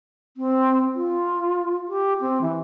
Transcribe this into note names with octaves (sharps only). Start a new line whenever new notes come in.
C4
F4
G4
C4
E3